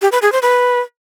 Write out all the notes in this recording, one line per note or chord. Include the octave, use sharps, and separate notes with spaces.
G4
B4
G#4
C5
B4